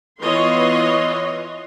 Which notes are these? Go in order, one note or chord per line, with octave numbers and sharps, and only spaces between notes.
E3 B3 F4 C#5 D#5 C6